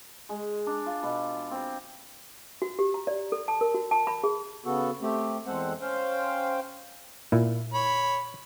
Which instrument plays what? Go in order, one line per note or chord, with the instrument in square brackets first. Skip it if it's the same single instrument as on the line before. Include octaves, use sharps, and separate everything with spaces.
[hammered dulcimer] G#3
D4
F4
B2
C4
[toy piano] F#4
G4
A#5
D5
A4
A5
A#4
F#4
A5
B5
G#4
[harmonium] C#3 B3 F#4 A4
A3 C4 G4
E2 G#3 C4 A4 C5 F#5
C#4 C5 F5 G5
[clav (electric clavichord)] A#2 E4
[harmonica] C#5 B5